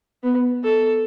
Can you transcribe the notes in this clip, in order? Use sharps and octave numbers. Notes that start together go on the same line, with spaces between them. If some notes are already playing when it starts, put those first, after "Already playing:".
B3
A4